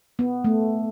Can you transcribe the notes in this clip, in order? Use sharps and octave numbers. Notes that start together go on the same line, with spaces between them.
B3
A3